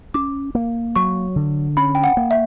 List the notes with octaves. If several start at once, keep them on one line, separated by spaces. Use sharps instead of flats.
C#4 D6
A#3
F#3 C#6
D3
C#4 B5
G5
F#5
A#3
E5